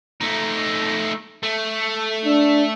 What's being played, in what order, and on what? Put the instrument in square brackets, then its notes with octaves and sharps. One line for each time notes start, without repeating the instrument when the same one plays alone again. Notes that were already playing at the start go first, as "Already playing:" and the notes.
[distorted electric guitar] A3 D#4
A3
[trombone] D4